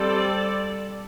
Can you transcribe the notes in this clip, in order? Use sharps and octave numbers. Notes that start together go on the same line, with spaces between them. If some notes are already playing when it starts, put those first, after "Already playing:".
Already playing: G3 C4 A4 D5